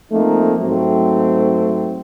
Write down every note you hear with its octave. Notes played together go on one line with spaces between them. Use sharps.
F3 A3 A#3 C4 D#4
G#2 F#3 A3 C4